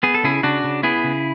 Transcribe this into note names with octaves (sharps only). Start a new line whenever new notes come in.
B3 G#4
A4
C#3 E4 G#4
C#3 D4 F#4
C#3
B3 E4 G#4
C#3